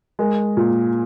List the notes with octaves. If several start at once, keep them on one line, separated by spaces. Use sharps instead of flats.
G#3 A#4
A#2